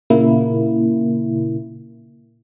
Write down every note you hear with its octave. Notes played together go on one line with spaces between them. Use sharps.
A#2 C#3 A#3 E4